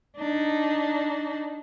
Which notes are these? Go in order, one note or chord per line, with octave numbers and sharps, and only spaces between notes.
D4 D#4